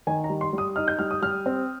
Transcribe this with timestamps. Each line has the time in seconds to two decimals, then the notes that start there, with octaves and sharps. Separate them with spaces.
0.07 D#3 G#5
0.24 A#5
0.30 G3
0.41 C6
0.53 G3
0.58 D#6
0.76 D#4 F6
0.88 G6
0.99 G3 F6
1.11 D#6
1.22 G3 F6
1.46 C4